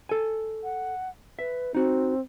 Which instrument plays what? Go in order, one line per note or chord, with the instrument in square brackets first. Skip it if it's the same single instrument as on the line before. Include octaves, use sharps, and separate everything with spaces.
[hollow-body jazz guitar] A4 G#5
[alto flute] F#5
[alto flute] B4 [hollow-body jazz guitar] E5
[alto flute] C4 [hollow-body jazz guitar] D#4 F#4